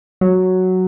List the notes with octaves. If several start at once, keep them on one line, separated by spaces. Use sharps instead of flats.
F#3